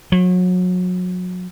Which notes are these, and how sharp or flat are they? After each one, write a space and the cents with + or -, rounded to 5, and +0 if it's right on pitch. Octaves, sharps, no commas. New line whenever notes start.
F#3 -30